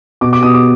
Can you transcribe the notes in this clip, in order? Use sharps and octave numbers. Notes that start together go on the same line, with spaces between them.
B2 D6
D6
B2 D#6
D6